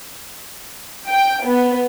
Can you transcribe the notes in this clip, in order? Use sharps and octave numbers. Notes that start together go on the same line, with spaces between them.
G5
B3